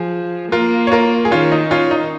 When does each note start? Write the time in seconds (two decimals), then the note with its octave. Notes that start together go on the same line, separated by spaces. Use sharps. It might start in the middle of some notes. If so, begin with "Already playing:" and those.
Already playing: F3 G#4
0.52 A#3 F4 A#4
0.87 C#5
0.92 F4 A#4
1.25 G#4
1.31 D#3 C#4 F4
1.52 D#4
1.71 C#4 F4
1.91 D#4